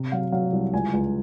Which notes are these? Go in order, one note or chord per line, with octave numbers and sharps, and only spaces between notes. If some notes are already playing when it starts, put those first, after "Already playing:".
Already playing: C3
F#3 F5
F#3 F5
C2
C#2 G#5
C#2